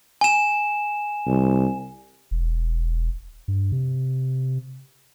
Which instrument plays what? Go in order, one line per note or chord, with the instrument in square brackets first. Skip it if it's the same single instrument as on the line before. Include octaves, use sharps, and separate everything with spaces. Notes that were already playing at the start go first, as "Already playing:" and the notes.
[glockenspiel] G#5 E7
[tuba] C2
[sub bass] E1
G2
C3